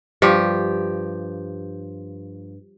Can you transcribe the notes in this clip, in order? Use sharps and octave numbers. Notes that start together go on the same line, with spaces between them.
G2 F3 G4